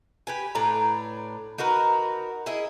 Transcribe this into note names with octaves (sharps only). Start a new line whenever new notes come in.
G4 B4 G#5
A2 D4 B4 A#5
D#4 F#4 A#4 B4
E4 G#4 D#5 E5